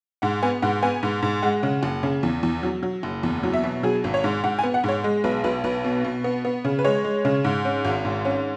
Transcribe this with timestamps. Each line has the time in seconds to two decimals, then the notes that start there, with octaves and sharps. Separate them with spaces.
0.22 G#2 F#5
0.43 B3 G#5
0.62 G#2 F#5
0.83 B3 G#5
1.03 G#2
1.22 G#2
1.43 G#3 F#5
1.63 C#3
1.83 F#1
2.03 C#3
2.23 E2
2.43 E2
2.63 F#3
2.83 F#3
3.03 F#1
3.23 E2
3.43 F#3
3.53 E5
3.64 B2
3.83 F#3 G#4
4.04 G#1
4.14 C#5
4.24 G#2
4.44 G#2 F#5
4.59 G#5
4.63 B3
4.74 F#5
4.84 G#2 C#5
5.04 G#3
5.24 B1 B4
5.44 B1 B4
5.64 B1 B4
5.84 B2
6.04 B2
6.24 B3
6.45 B3
6.65 C#3
6.79 B4
6.85 G#3 C#5
7.04 G#3
7.25 C#3
7.44 G#2
7.65 C#4
7.85 G#1
8.05 G#2
8.25 C#4